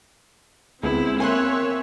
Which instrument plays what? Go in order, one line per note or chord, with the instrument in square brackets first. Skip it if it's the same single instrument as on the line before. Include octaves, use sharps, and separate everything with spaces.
[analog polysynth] D2 B3 [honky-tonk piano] G#3 [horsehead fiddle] C4 [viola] E4
[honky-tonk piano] A#3 [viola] C#5 E5 [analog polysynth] G#5 C6 F#6